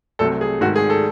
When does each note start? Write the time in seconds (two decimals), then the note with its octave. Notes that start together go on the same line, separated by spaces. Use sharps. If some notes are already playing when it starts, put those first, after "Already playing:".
0.19 C2 C3 F#3 A3 A4
0.41 G#4
0.61 G#2 D#3 A3 F#4
0.76 G#4
0.90 A4